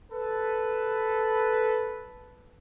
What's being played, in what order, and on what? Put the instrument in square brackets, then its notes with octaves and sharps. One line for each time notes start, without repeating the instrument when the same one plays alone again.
[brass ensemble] A4 B4